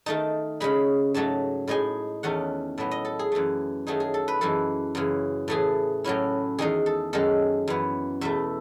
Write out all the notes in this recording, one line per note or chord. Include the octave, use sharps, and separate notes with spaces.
D#3 A3 D#4 A5
C#3 G#3 D#4 B5
G#2 F#3 A3 A5
A2 G#3 D#4 G#5
E2 D#3 A3 C#4 F#5
A2 F#3 B3 E5
D#5
A4
G#4
F#2 E3 A3
D#3 F#3 A3 D#4 G#4
G#4
A4
B4
F#2 E3 G#3 A4
F#2 C#3 E3
A2 E3 A3 G#4
A2 F#3 C#4 E4
E2 D#3 G#3 D#4 G#4
A4
F#2 D#3 G#3 C#4 A4
F#2 E3 B3
E2 B2 A3 E5